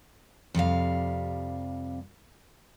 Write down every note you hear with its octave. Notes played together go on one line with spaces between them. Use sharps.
F2 C3 G3 F5